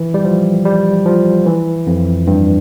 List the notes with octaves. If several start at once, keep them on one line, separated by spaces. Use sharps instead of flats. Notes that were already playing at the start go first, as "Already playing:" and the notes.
Already playing: E3
G3
F3
G3
F3
E3
F2
G2